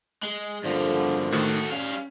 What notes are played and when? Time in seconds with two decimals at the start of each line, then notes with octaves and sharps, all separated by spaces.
0.23 G#3
0.65 G2 A#2 D3 F3 C5
1.32 A2 D#3 A3 F#4 A4
1.72 G3 C#4 F5